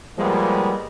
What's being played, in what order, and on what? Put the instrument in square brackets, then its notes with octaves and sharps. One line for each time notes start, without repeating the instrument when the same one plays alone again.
[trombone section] F3 G3 G#3 A#3 B3